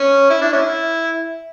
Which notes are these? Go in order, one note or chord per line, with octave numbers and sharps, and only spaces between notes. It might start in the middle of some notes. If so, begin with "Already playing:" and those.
Already playing: C#4
E4
D4
C#4 E4